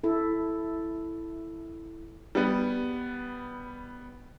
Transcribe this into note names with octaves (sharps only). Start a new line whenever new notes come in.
E4 A4
G3 B3